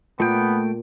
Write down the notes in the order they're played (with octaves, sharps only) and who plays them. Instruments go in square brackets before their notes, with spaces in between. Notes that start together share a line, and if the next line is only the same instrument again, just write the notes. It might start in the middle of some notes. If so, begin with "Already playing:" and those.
[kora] A#2 [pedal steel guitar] A3 G5 [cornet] B3